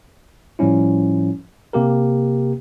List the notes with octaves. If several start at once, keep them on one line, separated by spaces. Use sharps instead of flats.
A2 F3 G3 C#4 E4
C3 A#3 G4 A#4